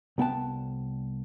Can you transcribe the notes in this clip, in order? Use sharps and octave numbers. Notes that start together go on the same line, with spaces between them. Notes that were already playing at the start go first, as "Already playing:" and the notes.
C2 B3 G5 A5